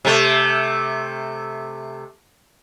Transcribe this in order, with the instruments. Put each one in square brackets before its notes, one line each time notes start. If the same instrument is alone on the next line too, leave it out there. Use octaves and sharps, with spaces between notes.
[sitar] C3 A3